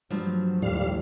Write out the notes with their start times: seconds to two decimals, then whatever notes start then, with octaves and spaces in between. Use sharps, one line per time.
0.10 G2 F3 F#3 A3
0.62 D#2 A2 G3 F5